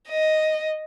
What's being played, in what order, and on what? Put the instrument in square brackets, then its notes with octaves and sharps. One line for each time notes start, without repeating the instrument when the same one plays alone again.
[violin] D#5